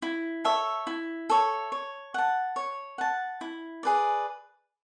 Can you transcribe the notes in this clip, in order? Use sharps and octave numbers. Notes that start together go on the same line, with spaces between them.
E4
A4 C#5 E5
E4
A4 C#5 E5
C#5
F#5 A5
C#5
F#5 A5
E4
G#4 B4 D5